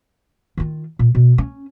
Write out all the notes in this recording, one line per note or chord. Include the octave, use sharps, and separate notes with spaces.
D#3 F4
A#2
B2
C#4